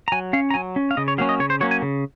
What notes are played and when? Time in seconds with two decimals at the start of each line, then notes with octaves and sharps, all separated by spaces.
0.08 A#5
0.12 F#3 G#5
0.33 C#4 F5
0.50 A#5
0.54 F#3 G#5
0.76 C#4
0.91 F5
0.97 C#3 D#5
1.08 C#5
1.18 F#3 A#3 C#4 F5
1.29 D#5
1.40 C#3 C#5
1.50 C5
1.61 F#3 A#3 C#4 C#5
1.71 G#5
1.82 C#3